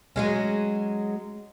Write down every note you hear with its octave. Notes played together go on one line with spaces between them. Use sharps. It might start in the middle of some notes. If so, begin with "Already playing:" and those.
F#3 G#3 C#4